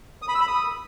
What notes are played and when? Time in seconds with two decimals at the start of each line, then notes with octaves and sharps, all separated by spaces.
0.22 D#6
0.28 B5
0.35 E6
0.41 B5
0.47 D#6